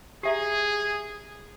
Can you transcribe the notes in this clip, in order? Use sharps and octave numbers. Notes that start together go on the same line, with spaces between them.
G4 G#4 E5 A#5